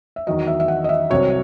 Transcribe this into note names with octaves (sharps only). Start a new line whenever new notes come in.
E5
E2 D#3 F#3 D#5
E5
E5
F#5
D#5
E5
C2 C3 F#3 C#5